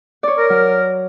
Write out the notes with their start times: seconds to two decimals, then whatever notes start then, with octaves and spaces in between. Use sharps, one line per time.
0.23 C#5 D5
0.37 A#4
0.50 F#3